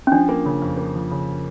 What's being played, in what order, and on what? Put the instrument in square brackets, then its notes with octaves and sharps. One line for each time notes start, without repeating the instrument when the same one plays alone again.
[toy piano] C#4
[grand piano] F3 [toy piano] D4
[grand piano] A#3
C#3
F2
A#3
F3
C#3